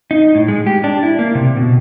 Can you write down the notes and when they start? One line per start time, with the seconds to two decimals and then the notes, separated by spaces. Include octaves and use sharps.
0.11 D#4
0.35 A2
0.48 G#3
0.67 G4
0.84 D4
1.03 E4
1.19 A#3
1.35 C3
1.57 B2